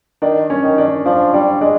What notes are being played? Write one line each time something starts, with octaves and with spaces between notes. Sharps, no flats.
D#3 D4
C#4
D#3
D4
F3 D4
G3 D4
G#3 D4